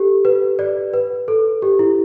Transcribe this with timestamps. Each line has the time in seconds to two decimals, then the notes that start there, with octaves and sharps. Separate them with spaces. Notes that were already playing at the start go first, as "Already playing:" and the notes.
Already playing: G4 A4
0.25 B4
0.59 D5
0.94 B4
1.28 A4
1.62 G4
1.79 E4